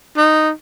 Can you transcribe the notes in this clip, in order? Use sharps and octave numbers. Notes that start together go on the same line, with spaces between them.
D#4